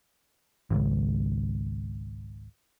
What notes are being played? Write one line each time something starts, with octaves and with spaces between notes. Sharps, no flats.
G#1 C#2